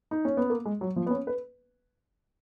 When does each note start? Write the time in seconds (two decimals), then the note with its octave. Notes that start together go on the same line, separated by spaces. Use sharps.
0.11 D#4
0.25 C#4
0.37 B3
0.50 A#3
0.65 G#3
0.81 F#3
0.96 F3
1.06 B3
1.11 C#4
1.27 B4